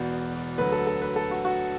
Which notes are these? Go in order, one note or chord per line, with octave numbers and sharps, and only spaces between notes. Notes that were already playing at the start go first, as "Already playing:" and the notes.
Already playing: E1 E2 B2 F#4 B4 D5
D2 D3 F#3 B4
A4
A4
B4
A4
F#4
F#4